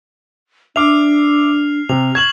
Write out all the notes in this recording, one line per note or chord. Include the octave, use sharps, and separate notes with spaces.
D4 E5 D6 F6 C7 F7
C3 F7
C#6 G#6 E7 F#7